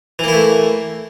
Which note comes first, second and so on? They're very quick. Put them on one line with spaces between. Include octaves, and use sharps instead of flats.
E3 A#3 E4 A3